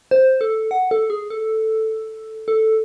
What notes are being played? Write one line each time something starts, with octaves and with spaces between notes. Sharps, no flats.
C5
A4
F#5
A4
G#4
A4
A4